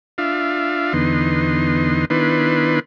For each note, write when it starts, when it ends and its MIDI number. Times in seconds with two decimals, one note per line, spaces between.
0.18 0.93 62
0.18 0.93 65
0.18 0.93 76
0.18 0.93 77
0.93 2.05 40
0.93 2.05 50
0.93 2.05 59
0.93 2.05 63
0.93 2.05 84
2.10 2.79 51
2.10 2.79 59
2.10 2.79 62
2.10 2.79 64
2.10 2.79 71
2.10 2.79 84